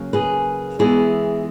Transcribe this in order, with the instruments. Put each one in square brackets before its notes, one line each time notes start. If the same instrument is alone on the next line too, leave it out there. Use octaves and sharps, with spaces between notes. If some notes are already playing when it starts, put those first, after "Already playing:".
Already playing: [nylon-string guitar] C#3 F#3 A#3 C#4
G#4 B4
E3 G#3 B3 E4 G#4